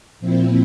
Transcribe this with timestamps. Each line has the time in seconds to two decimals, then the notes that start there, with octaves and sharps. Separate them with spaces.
0.20 A#2 F3 C4 E4